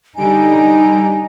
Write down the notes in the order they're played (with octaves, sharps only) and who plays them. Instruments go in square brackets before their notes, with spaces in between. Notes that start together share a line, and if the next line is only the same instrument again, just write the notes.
[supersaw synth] D3 G3 D7 [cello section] D#4 [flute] G#5